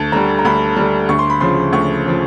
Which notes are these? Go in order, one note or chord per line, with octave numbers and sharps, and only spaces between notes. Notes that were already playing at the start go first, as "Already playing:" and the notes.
Already playing: D2 A5
D3 G3 A#5
A#5
D2 B5
D3 G3
D2 C#6
C6
B5
C#3 F3 C6
D2 C#6
C#3 F3